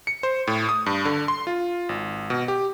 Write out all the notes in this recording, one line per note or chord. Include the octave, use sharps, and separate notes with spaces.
C#7
C5
A2
D#6
G2
D3
C6
F4
G#1
B2
G4